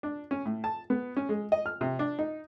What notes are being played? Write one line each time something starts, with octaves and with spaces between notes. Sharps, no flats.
D4
C#4
A2
A5
B3
C#4
G#3
D#5
F6
C3
D4
D#4